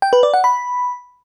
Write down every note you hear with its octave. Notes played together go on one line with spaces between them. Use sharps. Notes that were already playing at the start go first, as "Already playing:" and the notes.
G5
B4
D5
F#5
B5